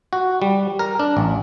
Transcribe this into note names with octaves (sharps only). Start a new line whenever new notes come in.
F#4
G3
A#4
D4
A1